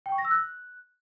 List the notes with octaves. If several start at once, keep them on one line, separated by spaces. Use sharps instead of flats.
G5
C#6
A#6
E6
F#6